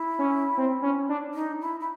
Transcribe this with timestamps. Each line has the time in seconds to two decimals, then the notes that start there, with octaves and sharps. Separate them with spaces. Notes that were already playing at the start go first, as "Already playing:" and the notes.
Already playing: E4
0.19 C#4
0.57 C4
0.82 C#4
1.09 D4
1.34 D#4
1.61 E4
1.80 E4